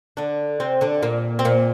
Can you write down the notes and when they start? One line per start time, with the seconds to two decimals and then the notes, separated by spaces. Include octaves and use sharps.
0.17 D3 D4
0.60 C3 C4
0.81 D3 D4
1.02 A#2 A#3
1.39 C4
1.45 A#2 A#3